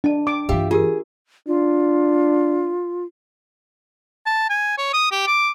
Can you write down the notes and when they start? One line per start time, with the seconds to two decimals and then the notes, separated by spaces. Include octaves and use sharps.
0.04 D4 D#5 A5
0.27 D6
0.49 G2 E3 F4 G4 E5
0.71 F4 G4 G#4 A#4
1.47 D4 F4
4.27 A5
4.50 G#5
4.78 C#5
4.94 D#6
5.12 G4
5.27 D6